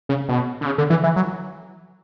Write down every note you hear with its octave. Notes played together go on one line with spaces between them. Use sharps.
C#3
B2
D3
C#3
D3
E3
E3
F#3